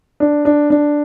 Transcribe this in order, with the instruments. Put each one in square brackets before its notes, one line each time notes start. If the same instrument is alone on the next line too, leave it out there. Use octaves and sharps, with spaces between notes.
[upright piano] D4
D4
D4